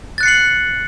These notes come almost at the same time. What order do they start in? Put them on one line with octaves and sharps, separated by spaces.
A6 F#6 C#7 C7 F#7